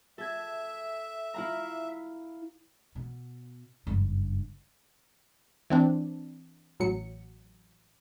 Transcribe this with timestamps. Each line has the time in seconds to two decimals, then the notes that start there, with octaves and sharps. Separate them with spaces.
0.18 A4 E5 G#6
1.34 E4 F5 A#5
2.95 B2
3.87 F#1 G2
5.70 E3 C4 D4
6.80 A1 F#3 C#7